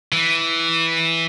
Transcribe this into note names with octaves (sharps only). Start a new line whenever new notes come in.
E3